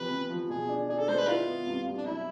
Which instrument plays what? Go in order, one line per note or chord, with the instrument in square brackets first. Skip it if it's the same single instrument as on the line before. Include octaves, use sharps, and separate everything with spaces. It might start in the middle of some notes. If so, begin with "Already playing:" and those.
Already playing: [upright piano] E2 C3 F3 [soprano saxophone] B4
[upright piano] C3
F3
[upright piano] B2 [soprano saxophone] G#4
[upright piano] D4
[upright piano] D4 [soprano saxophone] G#4
[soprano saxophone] A4
[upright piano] G#3 [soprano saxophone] C5
[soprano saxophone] B4
[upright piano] E4 [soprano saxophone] F4
[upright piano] B3
C2
C2
[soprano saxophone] D4
[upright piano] B1 [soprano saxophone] E4